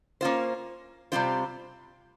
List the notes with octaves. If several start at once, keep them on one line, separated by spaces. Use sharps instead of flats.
A#3 C#4 F4 C5
C3 G3 C4 F4 C5